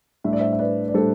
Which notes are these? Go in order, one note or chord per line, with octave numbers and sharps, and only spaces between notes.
A2 G3 D4 E5
D5
C5 E5
E5
B4 D5
D5
A2 G3 D4 A4 C5